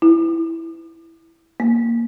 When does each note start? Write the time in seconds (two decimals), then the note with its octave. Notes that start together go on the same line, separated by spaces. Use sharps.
0.02 E4
1.60 A#3